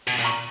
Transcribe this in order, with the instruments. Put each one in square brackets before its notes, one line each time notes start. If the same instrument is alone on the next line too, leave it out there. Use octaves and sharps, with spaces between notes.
[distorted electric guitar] B2
A#2
[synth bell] A#5 C#6